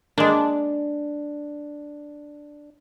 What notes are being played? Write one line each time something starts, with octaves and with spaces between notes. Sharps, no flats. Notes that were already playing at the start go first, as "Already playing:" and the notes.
G#3 A#3 D4